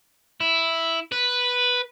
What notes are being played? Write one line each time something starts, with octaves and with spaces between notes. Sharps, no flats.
E4
B4